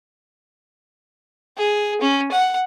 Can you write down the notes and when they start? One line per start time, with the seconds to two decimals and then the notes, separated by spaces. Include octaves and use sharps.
1.57 G#4
2.01 C#4
2.32 F#5